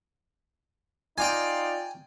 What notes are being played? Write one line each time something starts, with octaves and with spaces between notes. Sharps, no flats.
D#4 F4 D5 G5 G#5